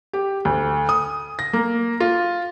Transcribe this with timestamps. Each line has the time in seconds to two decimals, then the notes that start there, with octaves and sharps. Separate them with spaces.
0.13 G4
0.45 D2
0.89 D#6
1.39 A#6
1.53 A#3
2.00 F4